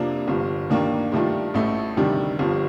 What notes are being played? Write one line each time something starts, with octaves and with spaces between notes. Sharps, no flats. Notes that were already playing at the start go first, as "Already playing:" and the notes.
Already playing: F2 C3 F3 A#3 D4
G1 G2 F3
D#2 D#3 A#3 D4
G2 D#3 A3 D4 F4
A1 A2 A3
D2 C3 D#3 G3 D4
G1 G2 F3